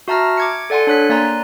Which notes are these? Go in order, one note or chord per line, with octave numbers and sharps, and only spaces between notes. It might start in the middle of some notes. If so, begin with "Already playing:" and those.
F#4 E5 A5 A#5 F6 A#6
D6 G#6 C#7
A4 D5 F#5 G#5 C6
D4 C#5 F#6 B6
A#3 D5 G#5 A#5 C6 F#6